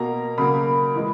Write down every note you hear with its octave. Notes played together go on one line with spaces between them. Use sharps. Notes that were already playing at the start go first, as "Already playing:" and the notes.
Already playing: B2 A#3 A#5
C#3 F#3 A#3 B5
E3 G#3